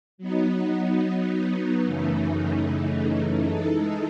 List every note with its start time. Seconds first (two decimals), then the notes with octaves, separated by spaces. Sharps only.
0.18 F#3 B3 D#4
1.84 F#2 C#3 E3 A3 D#4
3.49 E3 G#3 D#4 A4